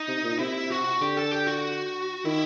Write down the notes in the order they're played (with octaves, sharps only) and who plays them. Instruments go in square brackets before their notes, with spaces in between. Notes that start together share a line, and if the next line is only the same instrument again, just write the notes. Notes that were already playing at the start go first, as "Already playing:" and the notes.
Already playing: [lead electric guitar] D#4
[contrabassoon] C3
A#2
[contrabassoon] C3 [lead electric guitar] E4
[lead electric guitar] F#4
[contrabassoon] D3 [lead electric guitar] G4
[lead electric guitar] A4
G4
F#4
[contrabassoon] D#3 [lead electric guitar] E4